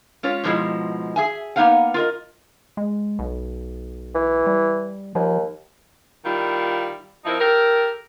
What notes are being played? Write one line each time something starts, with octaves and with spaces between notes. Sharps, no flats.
G#3 C#4 F4 C#5
G#2 B2 F3 G#3 E4 D#5
G#4 E5 G#5
A#3 B3 D#4 B4 F5 F#5
F4 A#4 D#5
G#3
B1
E3
G3
D#2 F3
D#3 G3 E4 F4
F3 C4 D#4 E4 A#4
G4 A4 A#4